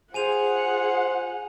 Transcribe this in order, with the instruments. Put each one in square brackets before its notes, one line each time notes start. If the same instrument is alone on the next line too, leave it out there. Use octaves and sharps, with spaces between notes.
[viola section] F4 G#4 [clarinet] C5 [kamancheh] F#5 [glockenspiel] G#5 D#7 F7